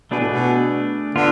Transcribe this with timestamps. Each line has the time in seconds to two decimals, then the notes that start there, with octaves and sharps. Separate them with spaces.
0.11 B2 A3 D4 G#4 B4
0.20 A2
0.28 B2
1.15 D3 B3 F4